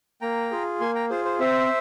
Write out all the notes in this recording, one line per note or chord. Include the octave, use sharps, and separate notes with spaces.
A#3 G5 A#5
F4 G#4
A#3 G#5 C6
G5 A#5
F4 G#4 C5
C5
C4 C5 E5